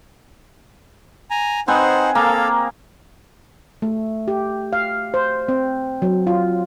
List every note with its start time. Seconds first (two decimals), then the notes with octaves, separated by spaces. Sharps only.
1.31 G#5 A#5
1.68 C4 D#4 G#4 B4 C5 F#5
2.15 A#3 A4 A#4 F5
3.82 A3
4.28 G4
4.73 F5
5.14 C5
5.49 C4
6.02 F#3
6.27 F4